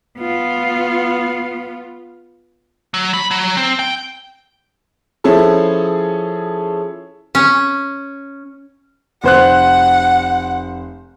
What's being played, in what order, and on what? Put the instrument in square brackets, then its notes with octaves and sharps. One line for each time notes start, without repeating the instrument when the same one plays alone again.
[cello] B3 F4
[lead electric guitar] F#3
B5
F#3
C4
G5
[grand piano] F3 C#4 E4 G#4 A4
[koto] C#4
[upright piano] F1 C5 F#6 [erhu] F#5